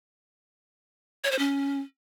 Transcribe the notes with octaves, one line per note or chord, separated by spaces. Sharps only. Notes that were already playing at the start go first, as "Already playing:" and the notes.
C#5
C5
C#4